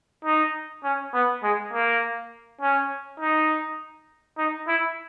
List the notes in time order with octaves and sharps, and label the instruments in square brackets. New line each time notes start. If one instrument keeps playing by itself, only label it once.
[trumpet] D#4
C#4
B3
G#3
A#3
C#4
D#4
D#4
E4